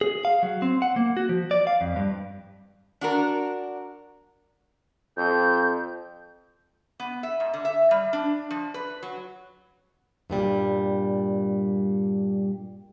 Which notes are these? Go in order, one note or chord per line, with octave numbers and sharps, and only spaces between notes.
G#4
F5
F#3
C4
F#5
A#3
F#4
F3
D5
F5
F2
G2
D4 F#4 A#4
F2 G6
B3
E5
G#2
D3
E5
G3
D4
F3
B4
F#3
G2 A#2 G3